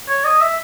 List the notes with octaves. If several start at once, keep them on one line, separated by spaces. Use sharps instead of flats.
C#5
D#5
E5